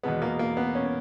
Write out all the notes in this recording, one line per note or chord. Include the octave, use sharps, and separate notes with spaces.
E2 B2 G#3 B3
A#3
A#3
B3
C#4